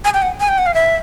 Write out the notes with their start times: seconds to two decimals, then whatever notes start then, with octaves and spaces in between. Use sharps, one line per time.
0.05 G#5
0.14 G5
0.22 F#5
0.40 G#5
0.49 G5
0.58 F#5
0.66 F5
0.74 E5